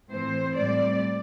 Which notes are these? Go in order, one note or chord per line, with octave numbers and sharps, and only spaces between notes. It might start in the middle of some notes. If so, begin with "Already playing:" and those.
A2 E3 C4 C5
A2 G3 C4 D5